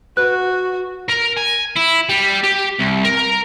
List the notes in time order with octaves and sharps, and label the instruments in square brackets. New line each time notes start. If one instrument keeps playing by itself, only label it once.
[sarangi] F#4 [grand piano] B4 [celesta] F#6
[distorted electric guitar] A#4
G#5
E4
G3
G4
C2
A#4